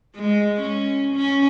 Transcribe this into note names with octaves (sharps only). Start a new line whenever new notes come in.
G#3
C#4
C#4